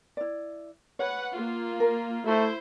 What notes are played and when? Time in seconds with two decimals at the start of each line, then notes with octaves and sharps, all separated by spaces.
0.17 E4 D5
0.99 B4 C#5 F#5
1.33 A#3 F4
1.80 A#4
2.26 A3 E4 C5